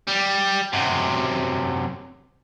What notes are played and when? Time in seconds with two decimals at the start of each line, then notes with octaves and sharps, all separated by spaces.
0.08 G3
0.73 F#2 C3